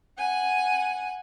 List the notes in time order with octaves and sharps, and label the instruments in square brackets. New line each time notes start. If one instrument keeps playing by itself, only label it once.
[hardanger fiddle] F#5 G#5